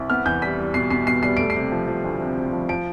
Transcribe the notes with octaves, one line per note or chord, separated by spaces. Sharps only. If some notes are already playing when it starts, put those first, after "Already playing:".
Already playing: C2
B3 F6
E2 G6
G3 B6
G3
B2 C7
B2 C7
B2 C7
G3 C7
A3 D7
C7
C3
F3
F3
D2
C3
C3
F3
F3 D7